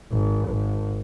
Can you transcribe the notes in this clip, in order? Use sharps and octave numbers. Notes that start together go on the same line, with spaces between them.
G#1
G#1